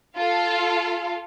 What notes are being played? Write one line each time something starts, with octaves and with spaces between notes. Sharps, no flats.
F4 A4 F5